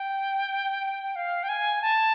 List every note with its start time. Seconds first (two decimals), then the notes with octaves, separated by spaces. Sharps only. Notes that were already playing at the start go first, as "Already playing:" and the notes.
Already playing: G5
1.16 F5
1.43 G5
1.49 G#5
1.82 A5